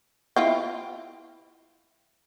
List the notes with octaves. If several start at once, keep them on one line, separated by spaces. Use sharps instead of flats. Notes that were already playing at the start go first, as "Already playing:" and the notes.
E4 F4 G5